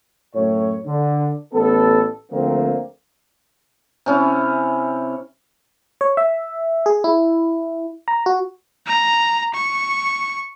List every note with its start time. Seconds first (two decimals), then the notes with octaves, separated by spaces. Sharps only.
0.34 F#2 A2 C#5
0.86 D3
1.53 A1 B3 A4
2.31 D2 F3 A3 A#3 C4
4.06 C3 C#4 E4
6.01 C#5
6.17 E5
6.86 G#4
7.04 E4
8.08 A#5
8.26 F#4
8.87 A#5
9.54 C#6